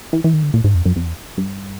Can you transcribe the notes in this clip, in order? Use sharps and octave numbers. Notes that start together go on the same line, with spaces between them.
E3
E3
D#3
D3
A#2
G#2
F2
F#2
F2
E2
G2